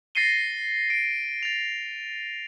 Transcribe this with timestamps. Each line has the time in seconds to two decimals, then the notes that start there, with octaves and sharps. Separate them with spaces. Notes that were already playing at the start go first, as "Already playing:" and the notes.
0.15 A6 A#6 C7 C#7 D#7 G7
0.90 D7
1.43 A6 F7